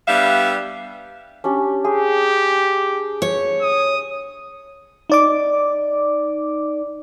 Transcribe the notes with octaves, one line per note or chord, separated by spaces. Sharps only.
G3 B3 D4 G4 E5 F5
C#4 D4 G4
G4 G#4 C6
C#5
D#6
D#4 D5 D6